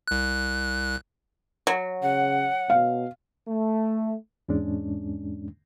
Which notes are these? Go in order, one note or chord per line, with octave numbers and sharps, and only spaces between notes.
C2 F#6
F#3
C#3 F#5
B2 F5
A3
E2 G#2 G#3 C#4 D4